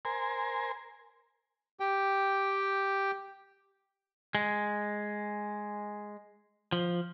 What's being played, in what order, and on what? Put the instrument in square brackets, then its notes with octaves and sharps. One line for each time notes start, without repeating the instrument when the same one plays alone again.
[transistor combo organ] A#4 C5 G#5
[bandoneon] G4 G5
[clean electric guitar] G#3
F3